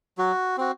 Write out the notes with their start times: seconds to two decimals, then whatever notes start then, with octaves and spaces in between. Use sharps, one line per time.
0.18 F#3 F#4
0.58 C4 F#4